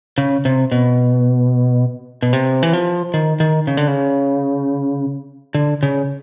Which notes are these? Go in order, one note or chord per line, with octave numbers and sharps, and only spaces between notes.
C#3
C3
B2
B2
C3
E3
F3
D#3
D#3
C#3
D3
C#3
D3
C#3